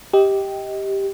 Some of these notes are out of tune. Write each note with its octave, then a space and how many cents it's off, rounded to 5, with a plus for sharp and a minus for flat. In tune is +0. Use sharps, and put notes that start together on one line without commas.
G4 +0 D#5 +20